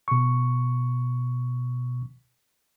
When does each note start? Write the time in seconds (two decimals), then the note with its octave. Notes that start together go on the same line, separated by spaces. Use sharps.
0.08 B2 C#6